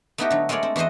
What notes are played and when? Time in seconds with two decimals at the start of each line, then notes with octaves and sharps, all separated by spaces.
0.18 A3 B3 D#4 E4 F#4 G4
0.30 D3 F#3
0.49 G#3 A3 A#4 C#5 D5
0.63 C4
0.76 E2 E4 F#4 C5 D#5